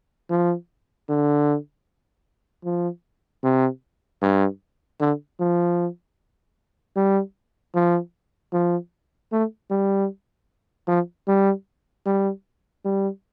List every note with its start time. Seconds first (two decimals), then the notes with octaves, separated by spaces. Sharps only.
0.30 F3
1.09 D3
2.65 F3
3.43 C3
4.22 G2
5.00 D3
5.40 F3
6.96 G3
7.75 F3
8.53 F3
9.32 A3
9.70 G3
10.88 F3
11.28 G3
12.06 G3
12.85 G3